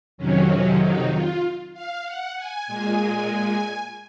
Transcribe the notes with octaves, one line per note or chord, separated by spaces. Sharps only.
F2 C3 D#3 F#3 C#4
D#4
F4
F5
F#5
G#5
A#2 G#3